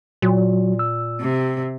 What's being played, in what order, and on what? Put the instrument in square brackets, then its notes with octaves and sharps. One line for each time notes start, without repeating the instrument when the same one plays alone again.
[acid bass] A#2 [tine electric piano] F#3 F#4
[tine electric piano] E6
[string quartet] C3